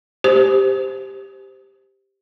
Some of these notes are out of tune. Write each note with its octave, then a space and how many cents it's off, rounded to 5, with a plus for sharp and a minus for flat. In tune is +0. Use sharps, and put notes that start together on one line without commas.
G4 +0 C5 -10